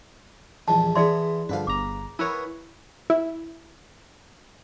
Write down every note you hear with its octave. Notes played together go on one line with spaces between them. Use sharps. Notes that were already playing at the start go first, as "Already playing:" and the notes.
A#1 E2 G3 A5
E3 B3 G#4 D5 C6
G2 D3 F3 B4 F5
G1 A#5 D6
B3 E4 A#4 B4 C#5 G#5
E4